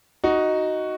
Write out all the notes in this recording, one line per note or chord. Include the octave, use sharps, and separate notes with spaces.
D#4 F#4